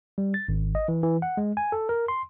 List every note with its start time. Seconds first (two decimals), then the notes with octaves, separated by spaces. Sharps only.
0.18 G3
0.34 A6
0.49 G#1
0.75 D#5
0.88 E3
1.03 E3
1.22 F#5
1.37 G#3
1.57 G#5
1.72 A4
1.89 A#4
2.08 C6